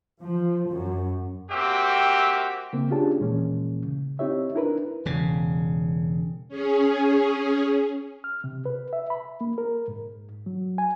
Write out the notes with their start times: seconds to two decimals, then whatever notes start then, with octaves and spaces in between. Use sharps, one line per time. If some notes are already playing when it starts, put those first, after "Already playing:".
0.20 F3
0.70 F#2
1.50 A#3 C4 F#4 G4 E5 G5
2.73 C#3 A#3 C4
2.91 C#4 D4 F4 G4 G#4 A5
3.20 D#2 A#2 E3 G#3 A#3 C#4
3.85 C#3
4.19 C4 D#4 E4 G4 C#5 E5
4.55 D4 E4 A#4 B4
5.05 E1 C#3
6.48 C#4 G#4
8.24 F6
8.44 C3
8.66 B4
8.93 E5
9.10 B5
9.41 A#3
9.58 A#4
9.88 G#2
10.46 F#3
10.78 G#5